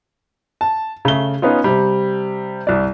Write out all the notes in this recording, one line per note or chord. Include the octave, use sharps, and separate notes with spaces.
A5
C#3 A3 G7
B3 C#4 D#4 F4
C3 G3
C2 D5